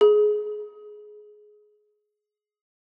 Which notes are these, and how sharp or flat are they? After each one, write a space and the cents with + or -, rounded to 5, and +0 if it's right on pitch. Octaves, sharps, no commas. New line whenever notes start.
G#4 +20